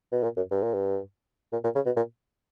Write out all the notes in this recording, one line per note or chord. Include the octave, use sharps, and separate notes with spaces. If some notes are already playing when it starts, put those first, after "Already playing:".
B2
A#2
F#2
G2
A#2
G2
A#2
A#2
C#3
B2
A#2